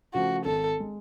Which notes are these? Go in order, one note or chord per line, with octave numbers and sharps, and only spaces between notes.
C#3 F3 A3 F#4
G#1 A4
G#3